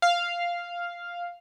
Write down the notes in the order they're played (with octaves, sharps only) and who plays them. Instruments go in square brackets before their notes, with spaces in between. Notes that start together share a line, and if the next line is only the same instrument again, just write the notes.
[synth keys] F5